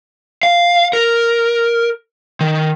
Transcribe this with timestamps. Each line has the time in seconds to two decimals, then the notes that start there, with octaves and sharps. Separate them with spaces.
0.43 F5
0.93 A#4
2.41 D#3